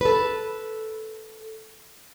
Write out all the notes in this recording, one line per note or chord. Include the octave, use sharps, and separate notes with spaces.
A4 B4